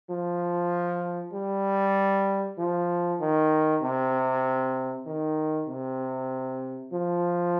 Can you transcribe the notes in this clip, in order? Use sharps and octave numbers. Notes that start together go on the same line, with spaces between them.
F3
G3
F3
D#3
C3
D#3
C3
F3